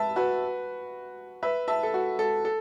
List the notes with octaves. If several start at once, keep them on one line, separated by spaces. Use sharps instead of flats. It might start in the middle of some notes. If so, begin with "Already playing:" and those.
Already playing: B4 E5 A5
F#4 B4
B4 E5
E5 A5
A4
F#4
A4
A4